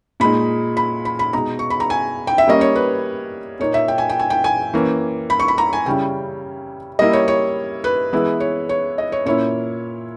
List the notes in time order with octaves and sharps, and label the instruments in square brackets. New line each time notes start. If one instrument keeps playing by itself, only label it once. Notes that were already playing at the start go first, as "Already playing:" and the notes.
[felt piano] A#2 G#3 D#4 B5
B5
B5
B5
B2 G#3 D#4 A#5
C#6
B5
A#5
G#5
G5
E5
G3 A#3 C#4 D#5
C#5
B4
A#2 A#3 D#4 C#5
E5
G5
G#5
G5
G#5
G5
G#5
E3 A#3 C#4
B5
C#6
B5
A#5
G#5
C#3 G3 C#4 E4 G5
G3 A#3 E4 D#5
C#5
C#5
B4
E3 G#3 B3 E4
C#5
C#5
D#5
C#5
A#2 A#3 C#4 E4 C#5